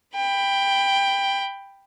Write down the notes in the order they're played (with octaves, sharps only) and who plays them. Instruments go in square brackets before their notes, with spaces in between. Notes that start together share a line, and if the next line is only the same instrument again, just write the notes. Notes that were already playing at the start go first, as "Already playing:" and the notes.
[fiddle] G5 B5